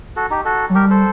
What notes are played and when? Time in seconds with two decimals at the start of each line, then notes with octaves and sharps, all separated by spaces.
0.16 F#4 A4
0.30 D#4 G4
0.45 F#4 A4
0.69 F#3
0.75 G3 G4 A#4
0.90 A4 C5